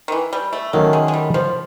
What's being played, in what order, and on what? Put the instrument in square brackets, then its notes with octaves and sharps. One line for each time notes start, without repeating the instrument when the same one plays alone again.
[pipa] D#3
E3
G3
A3
[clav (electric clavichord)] D#3 F#3 A3 C#4 [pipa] A#3
[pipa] G#3
G#3
G3
F3